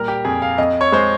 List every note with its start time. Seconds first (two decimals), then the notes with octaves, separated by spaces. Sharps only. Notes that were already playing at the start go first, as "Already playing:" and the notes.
Already playing: A#2 G3 A#4
0.08 G4
0.25 F2 G#4
0.42 F5
0.58 F2 D#5
0.81 C#5
0.92 G#3 C5